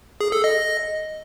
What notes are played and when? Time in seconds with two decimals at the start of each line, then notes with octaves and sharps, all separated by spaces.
0.21 G#4
0.32 A4
0.44 D#5